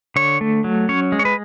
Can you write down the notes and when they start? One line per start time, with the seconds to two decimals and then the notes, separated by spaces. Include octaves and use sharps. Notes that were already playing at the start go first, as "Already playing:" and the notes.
0.16 D3 C#5
0.41 A3
0.64 F#3
0.89 C#4 C#5
1.12 G#3
1.19 C#5
1.25 B4